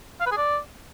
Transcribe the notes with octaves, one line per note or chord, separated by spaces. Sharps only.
F5
B4
G#4
D5